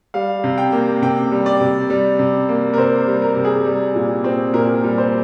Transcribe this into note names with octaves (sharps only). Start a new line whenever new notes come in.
G3 F5
C3
G5
A#3
C3 G5
G3
D5
C3
G3
C3
A#3
A#4
C3 C5
G3
A#4
C3
G#4
G3
A#2
C4
A#2 A#4
G3
C5